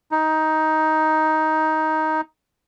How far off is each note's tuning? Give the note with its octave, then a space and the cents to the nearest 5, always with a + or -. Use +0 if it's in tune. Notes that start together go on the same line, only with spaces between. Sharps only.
D#4 +10